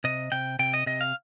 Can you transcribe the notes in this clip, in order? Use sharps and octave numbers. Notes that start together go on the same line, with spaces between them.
C3 D#5
C3 G5
C3 G5
D#5
C3 D#5
F5